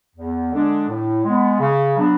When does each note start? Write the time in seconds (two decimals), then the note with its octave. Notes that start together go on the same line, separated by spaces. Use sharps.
0.16 E2
0.52 D3 G#3 D4
0.89 A2
1.24 G#3 B3
1.60 C#3
1.96 F#3 B3 D4